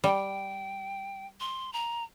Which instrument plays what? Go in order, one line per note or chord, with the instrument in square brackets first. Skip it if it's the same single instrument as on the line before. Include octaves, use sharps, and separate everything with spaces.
[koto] G3 [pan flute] G5
[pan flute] C6
A#5